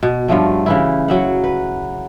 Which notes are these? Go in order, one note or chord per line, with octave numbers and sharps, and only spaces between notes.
B2
G2 F3 F#3 A3
C#3 E3 E4
F#3 E5 F#5
B4